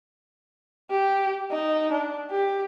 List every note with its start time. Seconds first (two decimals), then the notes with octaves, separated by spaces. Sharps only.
0.91 G4
1.51 D#4
1.92 D4
2.31 G4